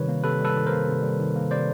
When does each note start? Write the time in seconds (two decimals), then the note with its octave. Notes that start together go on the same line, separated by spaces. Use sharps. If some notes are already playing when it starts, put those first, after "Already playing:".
Already playing: C3 D#3 G3 B4 C#5
0.08 A#3
0.23 C3 A4 B4
0.40 G3 A4 B4
0.56 D#3
0.66 A#3 A#4 C5
0.87 C3
1.03 G3
1.19 D#3
1.36 A#3
1.51 C3 C5 D5